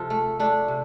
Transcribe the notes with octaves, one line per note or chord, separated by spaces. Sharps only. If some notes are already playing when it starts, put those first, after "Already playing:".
Already playing: C3 F3 F4 A4
A3
A3 D4
C3